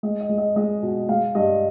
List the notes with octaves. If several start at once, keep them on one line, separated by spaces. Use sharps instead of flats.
G#3 D#5
D#5
G#3
D#5
G#3 D#5
B2
G#3 F5
G2 D#5